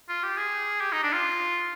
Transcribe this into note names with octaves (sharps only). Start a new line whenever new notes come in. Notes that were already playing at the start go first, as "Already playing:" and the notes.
F4
G4
G#4
G4
D#4
D4
F4